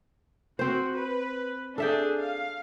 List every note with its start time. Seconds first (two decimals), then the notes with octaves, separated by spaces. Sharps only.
0.59 C4 F#4 C5
0.93 B4
1.78 D4 G#4 A4 E5 G5
2.16 F5